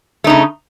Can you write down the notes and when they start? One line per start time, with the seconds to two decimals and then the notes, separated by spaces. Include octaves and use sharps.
0.24 A3
0.27 D#4
0.30 C#3